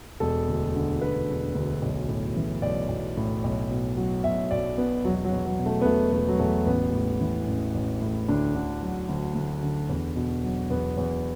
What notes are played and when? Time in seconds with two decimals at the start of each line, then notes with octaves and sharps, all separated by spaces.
0.20 E1 A4
0.48 D2
0.75 D3
1.01 E1 B4
1.29 E1
1.55 D2
1.82 B1
2.09 A2
2.36 E3
2.62 B1 D5
2.89 B1
3.17 A2
3.44 B1
3.71 B2
3.97 F#3
4.24 B1 E5
4.51 B1 D5
4.78 B2 B3
5.05 E1 F#3
5.25 F#3
5.32 E2
5.45 F#3
5.59 B2
5.66 A3
5.82 B3
5.85 E1 A3
6.13 E1 A3
6.29 F#3
6.39 E2 A3
6.66 A1 B3
6.93 A2
7.21 E3
7.47 A1
7.75 A1
8.02 A2
8.28 D2 D4
8.55 D3
8.82 F#3
9.09 D2
9.35 D2
9.63 D3
9.89 E2
10.16 B2
10.43 F#3
10.70 E2 B3
10.97 E2